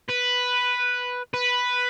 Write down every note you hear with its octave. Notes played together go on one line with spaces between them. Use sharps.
B4
B4